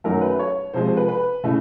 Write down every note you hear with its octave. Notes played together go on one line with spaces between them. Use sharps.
F#2 D#3 F#3 A3 A#4
B4
C#5
C3 F3 G#3 C5
C5
B4
B4
C#3 E3 A3